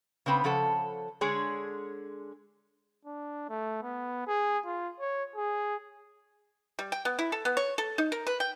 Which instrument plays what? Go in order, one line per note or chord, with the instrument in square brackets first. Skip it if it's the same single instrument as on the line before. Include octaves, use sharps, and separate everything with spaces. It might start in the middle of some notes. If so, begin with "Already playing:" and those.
[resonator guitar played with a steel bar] C#3 B3 C4 B4
C#3 F3 A4 F#5
D3 G#3 G#4 C#5
[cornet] D4
A3
B3
G#4
F4
C#5
G#4
[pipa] G3
G5
B3
E4
A4
B3
C#5
A4
D#4
A#4
B4
G5